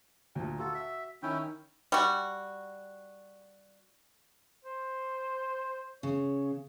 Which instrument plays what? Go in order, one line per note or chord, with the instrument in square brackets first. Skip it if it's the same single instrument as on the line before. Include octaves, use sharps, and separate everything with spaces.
[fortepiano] D2 A#2
[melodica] F4 A4 [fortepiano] F#4
[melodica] E5
[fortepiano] D#3 [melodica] C#4 E4 G5
[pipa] G3 F#4
[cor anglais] C5
[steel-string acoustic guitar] C#3 [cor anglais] C#5